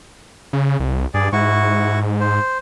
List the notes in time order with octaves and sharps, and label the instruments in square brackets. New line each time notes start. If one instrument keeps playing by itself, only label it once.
[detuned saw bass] C#3
C2
[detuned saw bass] G2 [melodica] G#4 D5
[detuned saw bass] G#2 [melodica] E4 F#4 C#6
[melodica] C5